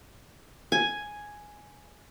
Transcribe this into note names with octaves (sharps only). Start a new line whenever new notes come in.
G#5